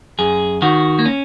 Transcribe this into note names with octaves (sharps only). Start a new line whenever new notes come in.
F#2 G#4
D#3 F#4
A#3
C#4